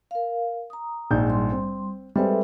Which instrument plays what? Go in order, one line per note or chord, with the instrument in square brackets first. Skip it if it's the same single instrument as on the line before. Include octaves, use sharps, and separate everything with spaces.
[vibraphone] A#4 F5
A#5 D#6
[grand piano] A#1 G#2 G6
[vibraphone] G3 C6
[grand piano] C4
[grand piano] G3 G#3 C4 [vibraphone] A4 B4 E5